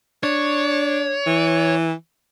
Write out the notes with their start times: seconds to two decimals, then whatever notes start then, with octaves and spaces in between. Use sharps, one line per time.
0.23 D4 C#5
1.27 E3